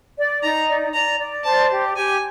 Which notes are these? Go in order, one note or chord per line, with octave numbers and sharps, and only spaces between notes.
D5
D#4 A#5
D5
D5 A#5
D5
C5 A5
G4
G4 G#5